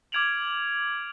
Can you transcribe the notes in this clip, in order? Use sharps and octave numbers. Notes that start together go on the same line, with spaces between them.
D6 F6 G#6 D7 F7 F#7